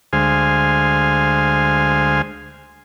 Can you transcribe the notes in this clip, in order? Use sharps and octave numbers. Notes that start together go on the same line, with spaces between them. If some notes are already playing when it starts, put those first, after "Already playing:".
D2 G#3 C5 F5 G#5